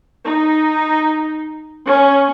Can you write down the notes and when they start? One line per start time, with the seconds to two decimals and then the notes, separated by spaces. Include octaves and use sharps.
0.25 D#4
1.87 C#4